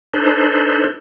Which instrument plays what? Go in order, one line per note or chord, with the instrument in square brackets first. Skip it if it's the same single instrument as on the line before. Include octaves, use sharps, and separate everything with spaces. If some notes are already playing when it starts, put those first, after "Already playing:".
[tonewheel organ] D4 D#4 A4 B4 C5